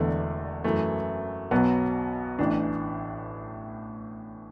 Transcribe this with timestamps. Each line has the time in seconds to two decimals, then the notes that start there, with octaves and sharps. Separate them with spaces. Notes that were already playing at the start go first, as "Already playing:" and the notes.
Already playing: E1 E2 D3 A3
0.64 F#2 E3 A3
1.51 B1 B2 F#3 B3
2.39 A1 A2 E3 D4